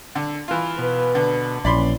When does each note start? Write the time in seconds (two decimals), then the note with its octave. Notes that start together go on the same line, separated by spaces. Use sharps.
0.15 D3
0.48 E3 F4
0.78 B2 B4
1.15 D3
1.65 A#1 E3 C#4 D5 B5 C6